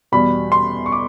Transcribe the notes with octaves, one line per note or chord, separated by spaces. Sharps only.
E2 B2 G3 B5
C6
C#6
D6